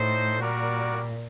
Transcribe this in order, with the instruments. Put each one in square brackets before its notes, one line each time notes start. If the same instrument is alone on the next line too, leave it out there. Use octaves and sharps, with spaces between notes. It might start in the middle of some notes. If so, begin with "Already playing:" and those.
Already playing: [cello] A2 [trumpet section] D#4 A4 C5
[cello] A#2 [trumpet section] G3 A#3 F#4 A#4 D5